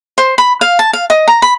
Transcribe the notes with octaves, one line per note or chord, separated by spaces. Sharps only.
C5
B5
F5
A5
F5
D#5
A#5
B5